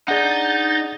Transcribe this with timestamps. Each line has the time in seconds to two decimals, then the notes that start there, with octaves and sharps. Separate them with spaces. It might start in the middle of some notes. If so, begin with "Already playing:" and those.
0.08 D4 D#4 G#4 D5 F#5 G6 A6